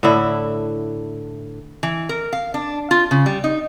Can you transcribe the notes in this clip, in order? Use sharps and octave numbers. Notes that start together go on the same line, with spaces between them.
A2 D3 E4
E3
A#4
F5
D4
F4
C#3
G3
D#4